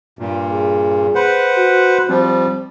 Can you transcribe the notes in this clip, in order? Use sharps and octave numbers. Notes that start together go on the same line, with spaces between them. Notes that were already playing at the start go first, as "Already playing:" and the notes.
G2 A#2
G#4
B4 C5 F#5
F#4
F3 G3 C4